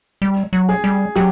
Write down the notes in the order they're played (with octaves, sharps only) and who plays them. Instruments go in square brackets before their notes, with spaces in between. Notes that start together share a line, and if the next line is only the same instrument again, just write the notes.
[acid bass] G3
F#3
[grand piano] G#4
[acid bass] G3
[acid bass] F#3 [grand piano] G4